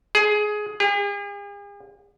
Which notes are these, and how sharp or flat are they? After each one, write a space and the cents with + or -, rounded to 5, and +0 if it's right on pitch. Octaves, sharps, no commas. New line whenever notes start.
G#4 +15
G#4 -45